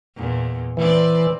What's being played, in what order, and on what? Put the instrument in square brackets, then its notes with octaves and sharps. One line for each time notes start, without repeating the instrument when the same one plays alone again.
[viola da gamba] E2 A#2
[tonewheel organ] E3 [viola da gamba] C4 B4 D5